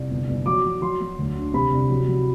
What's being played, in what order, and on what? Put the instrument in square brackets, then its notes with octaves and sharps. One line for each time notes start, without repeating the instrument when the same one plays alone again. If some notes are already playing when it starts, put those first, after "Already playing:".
Already playing: [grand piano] C2
G1
G1
F#3 D6
F#3
F#3 C6
F#3
D2
D3
C3 B5
C2
F#3
F#3